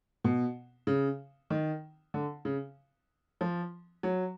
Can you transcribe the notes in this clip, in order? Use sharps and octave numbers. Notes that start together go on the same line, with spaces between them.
B2
C#3
D#3
D3
C#3
F3
F#3